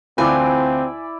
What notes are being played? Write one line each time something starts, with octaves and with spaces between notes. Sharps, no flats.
D2 E3 C4 E4 F4 D5 G#5